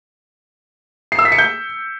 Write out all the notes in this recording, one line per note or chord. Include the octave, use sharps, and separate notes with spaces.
C7
E6
B6
C#7
G6